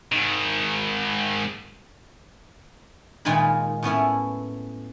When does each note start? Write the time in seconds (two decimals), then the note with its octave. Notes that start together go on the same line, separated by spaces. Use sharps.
0.12 G#2 D#3
3.25 A#2 D#3 G#3 F4 G#5 B5
3.83 A2 B3 C#4 E4